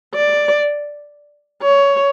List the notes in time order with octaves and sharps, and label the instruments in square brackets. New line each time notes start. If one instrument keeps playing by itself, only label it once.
[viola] D5
C#5